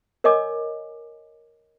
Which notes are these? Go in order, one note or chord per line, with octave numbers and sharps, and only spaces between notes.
A#4 C#5 D#5 G#5 D6